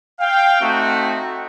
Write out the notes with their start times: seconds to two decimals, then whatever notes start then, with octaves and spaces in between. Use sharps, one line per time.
0.20 F5 G5
0.60 A3 C4 D#4 F#4